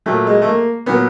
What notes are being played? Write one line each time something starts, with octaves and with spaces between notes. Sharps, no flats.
A#2 F#3 A3
G#3
A3
A#3
A#2 F#3 B3